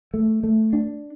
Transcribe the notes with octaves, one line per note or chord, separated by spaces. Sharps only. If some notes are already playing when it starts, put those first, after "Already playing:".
A3
A3
D4